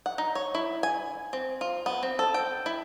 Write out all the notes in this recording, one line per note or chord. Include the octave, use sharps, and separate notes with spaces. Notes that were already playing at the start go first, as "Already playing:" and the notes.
F#5
D#4
C#5
E4
G#5
C4
F4
B3
C4
A4
G5
E4